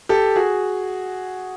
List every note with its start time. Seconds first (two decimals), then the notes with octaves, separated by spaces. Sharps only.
0.09 G4 A4
0.36 F#4 G#4